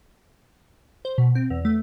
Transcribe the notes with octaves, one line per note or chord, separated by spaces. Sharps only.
C5
B2
C4
E2
A3